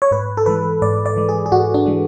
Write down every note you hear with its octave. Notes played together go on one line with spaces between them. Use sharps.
C#5
G#2 B4
A4
E3 G#3 B4
G#2 D5
D5
E3 G#3
G#4
G#4
G#2 F#4
D4
E3 G#3